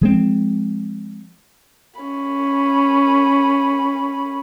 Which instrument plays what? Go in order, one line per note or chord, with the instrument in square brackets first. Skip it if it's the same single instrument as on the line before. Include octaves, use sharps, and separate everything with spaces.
[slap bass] F3 G#3 C4
[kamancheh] C#4 B5